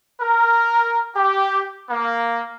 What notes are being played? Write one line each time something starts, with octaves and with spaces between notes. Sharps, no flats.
A#4
G4
A#3